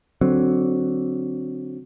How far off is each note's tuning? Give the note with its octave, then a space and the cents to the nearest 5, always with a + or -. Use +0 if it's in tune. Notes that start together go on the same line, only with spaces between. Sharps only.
D3 -15 F#3 +0 C4 +0